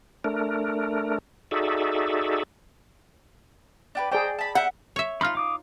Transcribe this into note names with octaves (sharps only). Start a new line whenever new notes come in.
A3 D4 A#4
D#4 F#4 G#4 A4 D5 E5
D4 G4 B4
G#4 C5 D5 G5 A#5
A5 B5
E5 F#5 G6
C#5 E5
D#4 F4 B5 C6 F6
F5 D6 D#6